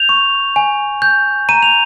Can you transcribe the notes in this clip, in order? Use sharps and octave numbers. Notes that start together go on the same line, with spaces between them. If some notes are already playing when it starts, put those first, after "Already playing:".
Already playing: G6 F7
C#6
G#5
G6
A#5 D#7
F7